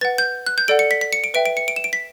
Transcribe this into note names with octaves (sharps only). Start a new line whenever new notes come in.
B4 F#5 A6
G6
F#6
G6
A4 D5 F#5 D7
C#7
B6
B6
C#7
D7
B4 E5 G5 D7
D7
C#7
D7
E7
D7
B6